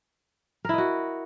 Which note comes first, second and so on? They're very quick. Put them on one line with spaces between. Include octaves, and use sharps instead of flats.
A#4 E4 D#5 F#4